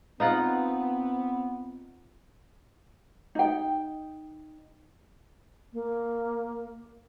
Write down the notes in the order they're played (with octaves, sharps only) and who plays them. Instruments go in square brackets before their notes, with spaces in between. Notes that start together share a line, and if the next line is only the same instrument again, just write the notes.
[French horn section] B3 C4 [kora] D#4 F4 F#5
[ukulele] D#4 G5
[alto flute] A#3